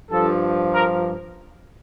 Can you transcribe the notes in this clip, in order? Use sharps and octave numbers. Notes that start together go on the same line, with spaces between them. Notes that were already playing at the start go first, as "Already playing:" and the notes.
G2 F3 A4
A#4